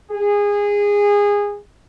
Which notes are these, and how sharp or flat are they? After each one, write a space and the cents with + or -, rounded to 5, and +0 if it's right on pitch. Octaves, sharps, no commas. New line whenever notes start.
G#4 -20